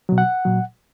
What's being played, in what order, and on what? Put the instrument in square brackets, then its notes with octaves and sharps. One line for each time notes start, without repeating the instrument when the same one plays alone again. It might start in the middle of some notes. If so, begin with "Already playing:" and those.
[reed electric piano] B2 F#3
F#5
A#2 F#3